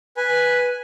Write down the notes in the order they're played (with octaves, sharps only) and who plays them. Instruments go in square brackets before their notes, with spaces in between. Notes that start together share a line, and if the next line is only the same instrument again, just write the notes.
[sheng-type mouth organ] B4 G#5